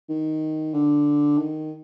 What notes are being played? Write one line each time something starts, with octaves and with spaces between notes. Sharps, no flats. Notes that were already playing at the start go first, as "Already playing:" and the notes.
D#3
D3
D#3